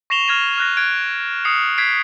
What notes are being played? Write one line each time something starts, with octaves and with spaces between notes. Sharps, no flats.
C#6 A#6 C7 E7 F7 G7
F6 G#6 A#6 D#7
F6 F#6 A#6
F#6 G#6 D7
D#6 C7 C#7 F7
G6 G#6 B6 C7 D7